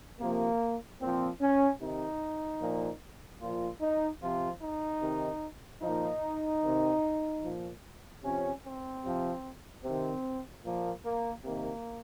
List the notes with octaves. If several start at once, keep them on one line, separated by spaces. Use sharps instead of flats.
C3 F3 A#3
A#2 F3 C4
C#4
C3 D#3 D#4
A#2 F3
A#2 F3 F4
D#4
C3 F3 F4
D#4
C3 D#3
A#2 F3 D#4
C3 D#3
A#2 F3
C3 F3 C#4
C4
C3 F3
C3 D#3 C4
A#2 F3 A#3
A#3
C3 D#3 A#3